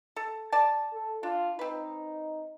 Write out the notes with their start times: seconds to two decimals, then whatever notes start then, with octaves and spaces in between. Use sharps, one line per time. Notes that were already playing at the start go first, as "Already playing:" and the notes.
0.16 A4
0.52 D5 A5
0.92 A4
1.23 D4 F4
1.59 C4 D#4 B4